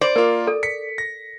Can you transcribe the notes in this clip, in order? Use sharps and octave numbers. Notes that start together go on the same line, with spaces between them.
C5 D5
A#3 F4 A#4
A4
B6 C#7
A#6